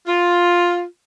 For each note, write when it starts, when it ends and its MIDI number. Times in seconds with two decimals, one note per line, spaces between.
0.07 0.83 65